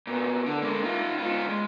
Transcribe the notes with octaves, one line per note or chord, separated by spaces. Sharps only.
A#2 B3
D3
G#3 A#3
D#4 F4
G#2 F4
G#3